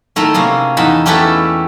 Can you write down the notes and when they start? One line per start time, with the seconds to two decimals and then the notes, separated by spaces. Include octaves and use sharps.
0.16 D#3 A3 E4 A#4
0.34 C3 A#3 C#4 G#4
0.77 E2 D#4 A5 B5
1.06 A3 C#4 E4 G4 A4 B4